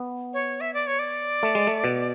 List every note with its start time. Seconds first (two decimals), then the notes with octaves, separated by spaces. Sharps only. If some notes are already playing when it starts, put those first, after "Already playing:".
Already playing: B3
0.33 C#5
0.61 E5
0.74 D5
0.87 C#5
0.99 D5
1.43 A3
1.55 G#3
1.67 A3
1.84 B2